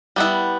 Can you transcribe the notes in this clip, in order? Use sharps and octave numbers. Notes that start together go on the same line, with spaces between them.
G3 B3 E4